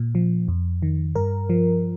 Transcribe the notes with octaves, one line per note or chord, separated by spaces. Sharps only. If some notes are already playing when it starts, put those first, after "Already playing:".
Already playing: A#2
F3
F2
D#3
G2 A#4
F3